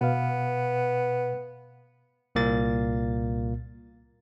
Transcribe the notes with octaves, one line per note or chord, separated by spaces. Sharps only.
B2 B3 B4 F5
C2 A#2 A#3 A6